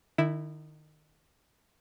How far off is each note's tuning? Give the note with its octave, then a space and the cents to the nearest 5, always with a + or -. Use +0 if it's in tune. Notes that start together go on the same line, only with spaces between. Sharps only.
D#3 -30 E4 +0